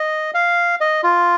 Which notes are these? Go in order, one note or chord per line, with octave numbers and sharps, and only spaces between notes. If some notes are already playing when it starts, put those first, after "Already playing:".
Already playing: D#5
F5
D#5
F4